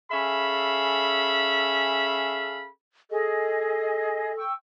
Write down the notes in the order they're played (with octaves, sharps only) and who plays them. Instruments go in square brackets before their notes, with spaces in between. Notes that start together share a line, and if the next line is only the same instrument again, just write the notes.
[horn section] C#4 G#4 A4 E5 F5 B5
[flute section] G#4 D#5 [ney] A4
[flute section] G5 C#6 E6